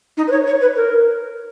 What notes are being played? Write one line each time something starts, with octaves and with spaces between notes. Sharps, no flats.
D#4
B4
C#5
C#5
B4
A#4